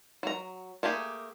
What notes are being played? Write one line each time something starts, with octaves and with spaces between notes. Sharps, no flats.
F#3 A#5
A3 A#3 G4 G#4